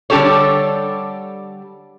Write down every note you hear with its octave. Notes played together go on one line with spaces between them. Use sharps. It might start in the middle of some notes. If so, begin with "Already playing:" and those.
D3 G3 D4 G4 A4 C#5